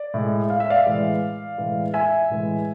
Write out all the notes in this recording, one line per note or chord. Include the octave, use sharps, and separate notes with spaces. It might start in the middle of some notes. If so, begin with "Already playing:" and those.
Already playing: D5
A2 G#3
F5
E5
D5 F5
A2 E3 G#3
A2 E3 G#3
E5 G#5
A2 E3 G#3